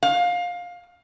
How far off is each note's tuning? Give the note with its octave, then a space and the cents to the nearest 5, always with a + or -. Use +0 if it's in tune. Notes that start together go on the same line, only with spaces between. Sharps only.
F5 +20